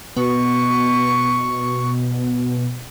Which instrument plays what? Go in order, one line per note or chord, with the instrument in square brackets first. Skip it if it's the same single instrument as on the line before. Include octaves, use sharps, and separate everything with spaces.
[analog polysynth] B2 [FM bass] B3 [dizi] C#6